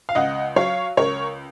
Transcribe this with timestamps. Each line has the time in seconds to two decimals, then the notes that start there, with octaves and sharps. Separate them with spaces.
0.09 F5
0.15 C#2 D#5 F#5
0.56 F#3 C#5 F5
0.97 C#2 A#4 C#5